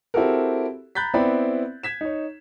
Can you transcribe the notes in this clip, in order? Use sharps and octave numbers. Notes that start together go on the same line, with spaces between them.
C4 E4 F#4 G4 A4 A#4
A#5 B5 F#6 G6 A6 B6
B3 C4 E4 D5 G5 B5
G#6 B6 E7
D#4 C#5